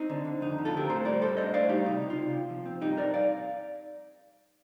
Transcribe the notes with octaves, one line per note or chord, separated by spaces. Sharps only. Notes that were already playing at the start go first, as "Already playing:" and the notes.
Already playing: C4 D#4
D3
D3
F2 D#4
D3
F4 A4
C4 G4 A#4
A2 A4 C5
G3 A#4 D5
A2 A4 C5
D4 C5 D#5
A2 D5 F5
G3 D#4 G4
C3 D#4
C3
F4
C3
C3
F3
C4
G2 D#4 G4
G2 A#4 D5
D5 F5